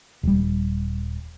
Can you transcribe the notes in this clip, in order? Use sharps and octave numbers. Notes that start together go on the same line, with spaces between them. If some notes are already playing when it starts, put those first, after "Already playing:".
D#1 G3